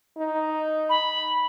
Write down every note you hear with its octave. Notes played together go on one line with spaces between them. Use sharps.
D#4
B5